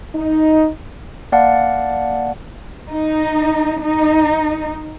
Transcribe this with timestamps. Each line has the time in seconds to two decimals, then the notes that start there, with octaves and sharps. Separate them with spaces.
0.16 D#4
1.32 A#3 D5 F5 F#5 A5
2.89 D#4
3.82 D#4